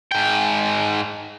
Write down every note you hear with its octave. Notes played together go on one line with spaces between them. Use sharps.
G#2 G5